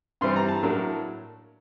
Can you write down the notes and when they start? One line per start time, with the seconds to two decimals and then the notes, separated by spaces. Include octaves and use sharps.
0.21 G2 E3 G3 C4 C6
0.36 A#5
0.48 A5
0.63 A2 F#3 A#3 D4